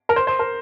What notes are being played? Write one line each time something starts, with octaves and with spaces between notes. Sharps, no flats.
A#4
C5
C5
A#4